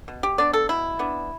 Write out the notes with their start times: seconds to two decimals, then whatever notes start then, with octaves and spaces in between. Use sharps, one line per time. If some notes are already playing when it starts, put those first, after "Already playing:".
0.08 B2
0.23 G4
0.38 B3 D4 D5
0.53 A4
0.69 B2 E4
0.99 B3 D4